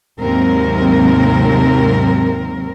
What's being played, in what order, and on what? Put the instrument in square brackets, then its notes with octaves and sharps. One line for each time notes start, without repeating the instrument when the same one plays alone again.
[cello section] D#2 G#2 C3 F#3 C4 A#4